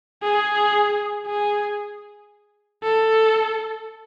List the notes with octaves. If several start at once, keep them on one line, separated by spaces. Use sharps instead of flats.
G#4
G#4
A4